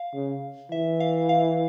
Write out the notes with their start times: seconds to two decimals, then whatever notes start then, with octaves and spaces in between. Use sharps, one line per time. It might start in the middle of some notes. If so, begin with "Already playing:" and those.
Already playing: F5
0.14 C#3
0.71 E3 E5
1.00 F5
1.29 F5